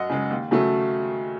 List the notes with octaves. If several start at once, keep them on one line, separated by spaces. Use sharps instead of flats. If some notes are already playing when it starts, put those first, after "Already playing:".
Already playing: F#2 D#5 F#5
C#3 G#3
D#2
C#3 F#3 A3